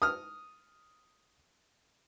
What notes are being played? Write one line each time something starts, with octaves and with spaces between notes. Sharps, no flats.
D#6 F6